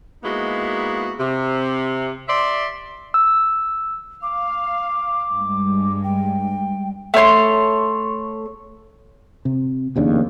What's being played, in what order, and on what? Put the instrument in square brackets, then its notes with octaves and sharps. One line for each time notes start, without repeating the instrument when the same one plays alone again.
[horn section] G#3 A#3 B3 D#4 E4 F#4
C3
D5 E5 C6
[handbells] E6
[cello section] F5 [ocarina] D6
[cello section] G2 G3 G#3
[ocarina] G5
[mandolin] A3 C#5 G#5 C6
[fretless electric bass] C3
F1 D#2 C#3 D4